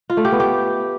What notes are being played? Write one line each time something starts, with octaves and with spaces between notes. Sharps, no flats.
F4
A3
G4
B3
G4